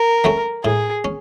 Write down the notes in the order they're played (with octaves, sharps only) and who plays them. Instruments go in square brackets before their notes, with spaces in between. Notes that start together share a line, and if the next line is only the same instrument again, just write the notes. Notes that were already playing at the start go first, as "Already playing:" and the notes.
Already playing: [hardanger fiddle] A#4
[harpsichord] F#3 A3 C#4
[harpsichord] A2 [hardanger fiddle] G#4
[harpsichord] C#4